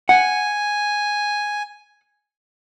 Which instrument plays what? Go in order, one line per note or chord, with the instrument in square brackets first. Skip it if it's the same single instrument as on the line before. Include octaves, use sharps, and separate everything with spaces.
[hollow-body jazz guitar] F#5 [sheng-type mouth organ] G#5